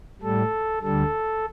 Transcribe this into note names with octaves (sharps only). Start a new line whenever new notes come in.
A2 G3 A4
D2 D3 G3 A4